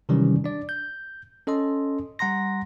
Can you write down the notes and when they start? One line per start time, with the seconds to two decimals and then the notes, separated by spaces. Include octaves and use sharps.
0.09 C3 D#3 E3 F#3 G3 C#4
0.44 D4 D5
0.69 G6
1.47 C#4 A4 D#5 C6
2.19 G3 F#5 A#5 C6 A#6